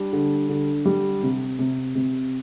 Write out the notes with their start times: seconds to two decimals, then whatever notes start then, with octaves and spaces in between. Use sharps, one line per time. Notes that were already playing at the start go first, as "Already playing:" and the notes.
Already playing: G3 D4
0.13 D3
0.49 D3
0.86 G3
1.23 C3
1.59 C3
1.95 C3